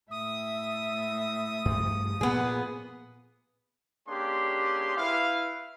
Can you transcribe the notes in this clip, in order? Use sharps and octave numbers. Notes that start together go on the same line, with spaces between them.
A2 E5 D#6
G2 F3 A3
A#2 B3 G#4
A#3 C#4 D4 G4 G#4 C6
E4 B4 F5